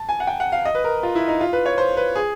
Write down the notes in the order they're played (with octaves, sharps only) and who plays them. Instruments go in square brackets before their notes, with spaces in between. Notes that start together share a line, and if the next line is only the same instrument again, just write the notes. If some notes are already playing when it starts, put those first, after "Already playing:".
Already playing: [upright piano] A5
G#5
F#5
G5
F#5
F5
D#5
B4
A#4
F4
E4
D#4
F4
B4
C#5
C5
B4
G#4